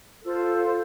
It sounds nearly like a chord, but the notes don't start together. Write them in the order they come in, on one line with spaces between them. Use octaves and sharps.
A4 F4 C5